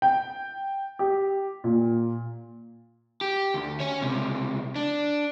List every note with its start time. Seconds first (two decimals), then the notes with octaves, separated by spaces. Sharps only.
0.02 G5
0.99 G4
1.64 A#2
3.21 G4
3.54 D2
3.80 C#5 G#5
4.02 C#2 C3
4.76 D4